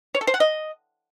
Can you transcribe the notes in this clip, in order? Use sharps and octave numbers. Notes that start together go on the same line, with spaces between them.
C#5
A4
C5
F#5
D#5